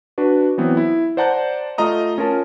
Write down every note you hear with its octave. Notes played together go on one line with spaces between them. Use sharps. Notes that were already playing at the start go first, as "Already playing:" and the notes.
D4 F#4 B4
E3 F#3 B3 C4
E4
C5 D5 F#5 A5 A#5 G6
A3 F4 D#5 A#5 D#6
C#4 F4 A#4 A5